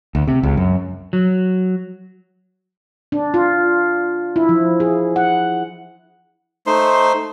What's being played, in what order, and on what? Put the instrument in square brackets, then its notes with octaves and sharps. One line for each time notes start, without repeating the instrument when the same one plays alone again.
[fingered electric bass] D2
C3
C#2
F#2
[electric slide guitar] F#3
[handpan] D4
F4
E4
F3
G#4
F#5
[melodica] A3 D#4 C5 C6